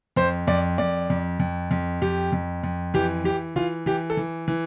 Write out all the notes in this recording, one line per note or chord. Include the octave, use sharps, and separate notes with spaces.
F2 C5
F2 D5
F2 D5
F2
F2
F2
F2 G4
F2
F2
E3 G4
E3 G4
E3 F4
E3 G4
A4
E3
E3